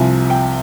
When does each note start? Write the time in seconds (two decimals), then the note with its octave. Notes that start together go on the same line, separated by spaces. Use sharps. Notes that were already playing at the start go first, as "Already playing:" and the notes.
Already playing: C2 C3 F3 G#5
0.30 G5